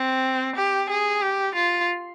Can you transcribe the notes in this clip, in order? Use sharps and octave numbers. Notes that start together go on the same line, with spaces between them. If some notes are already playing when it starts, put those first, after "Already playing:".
Already playing: C4
G4
G#4
G4
F4